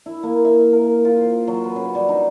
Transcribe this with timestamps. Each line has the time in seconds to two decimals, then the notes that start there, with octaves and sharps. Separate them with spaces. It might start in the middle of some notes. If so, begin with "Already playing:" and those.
0.06 E4
0.23 A#3
0.45 E5
0.73 A#4
1.05 F4
1.21 C5
1.47 F#3
1.64 B4
1.76 C#3
1.95 G3
2.09 D#4